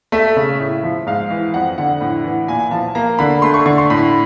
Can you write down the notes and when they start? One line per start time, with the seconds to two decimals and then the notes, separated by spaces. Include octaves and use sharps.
0.12 A3 E5
0.36 C#3
0.60 A2
0.84 F3
1.07 G#2 F5
1.30 E3
1.54 F2 F#5
1.78 D3 F#5
2.01 A2
2.24 E3
2.48 A#2 G#5
2.71 F3 A5
2.95 A#3 A#5
3.19 D3 B5
3.42 A3 C6
3.54 C#6
3.66 D3 C#6
3.78 C6
3.90 A2 B5